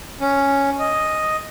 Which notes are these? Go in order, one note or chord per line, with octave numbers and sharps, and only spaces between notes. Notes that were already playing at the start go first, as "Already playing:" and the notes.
C#4
D#5